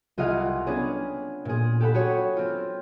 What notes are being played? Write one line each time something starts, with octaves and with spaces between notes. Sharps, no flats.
C2 F4 G#4 D#5 F5 F#5
B3 C#4 D4 G#4
A#2 G#4
G4 A4 F#5 B5
F#4 G#4 C#5
C4 F4